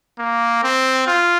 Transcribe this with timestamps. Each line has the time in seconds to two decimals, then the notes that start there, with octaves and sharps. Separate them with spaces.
0.19 A#3
0.64 C4
1.07 F4